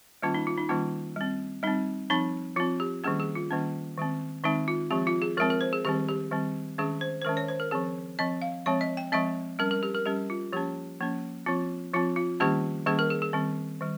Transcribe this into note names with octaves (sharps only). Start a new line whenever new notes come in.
D#3 G3 A#3 C#4 F4
D#4
F4
D#4
D#3 G3 A#3 C#4 F4
G3 C4
G3 C4 D#4
F3 C4 D#4
F3 C4 F4
G4
D#3 G3 A#3 C#4 G#4
G#4
F4
D#3 G3 A#3 C#4
D#3 G#3 C4
D#3 G#3 C4 D#4
F4
F3 G#3 C4 G4
F4
G#4
F3 G#3 C4 A#4
A#4
C5
G#4
D#3 G3 C4 G4
G4
D#3 G3 C4
D#3 G#3 C#4 G#4
C5
C5
D#3 G#3 C#4 A#4
C#5
C5
A#4
F3 C4 G#4
F3 C4 D#5
F5
F3 G#3 C4 C#5
D#5
G5
F3 G#3 C4 D#5
G3 C#4 A#4
A#4
G4
A#4
G3 C#4 G4
F4
F3 A#3 C#4 G4
F3 A#3 C#4
F3 C4 F4
F3 C4 F4
F4
D#3 G3 A#3 C#4 G4
D#3 G3 A#3 C#4 G#4
A#4
G#4
G#4
D#3 G3 C4
D#3 G3